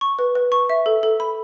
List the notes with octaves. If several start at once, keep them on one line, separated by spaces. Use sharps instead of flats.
C#6
B4
B4
C#6
E5
A4
A4
B5